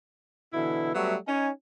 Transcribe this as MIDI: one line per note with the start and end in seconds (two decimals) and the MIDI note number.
0.54 0.94 47
0.54 0.94 50
0.54 0.94 52
0.54 0.94 64
0.95 1.15 54
0.95 1.15 55
0.95 1.15 57
0.95 1.15 59
0.95 1.15 66
0.95 1.15 76
1.28 1.49 61
1.28 1.49 63
1.28 1.49 80